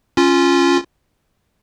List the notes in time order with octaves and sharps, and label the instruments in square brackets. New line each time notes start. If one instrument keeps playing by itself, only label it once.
[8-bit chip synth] C#4 F4